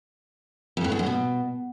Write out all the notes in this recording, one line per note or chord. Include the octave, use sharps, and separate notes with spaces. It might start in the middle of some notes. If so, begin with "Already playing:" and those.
F2
A2
E2
F#2
B2